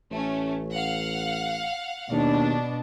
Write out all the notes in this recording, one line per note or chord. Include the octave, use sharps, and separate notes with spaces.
A1 A3 C#4
F5 F#5
D#2 B2 D4